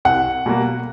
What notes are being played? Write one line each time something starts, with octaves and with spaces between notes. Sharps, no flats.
C2 F#5
B2 G3 A#3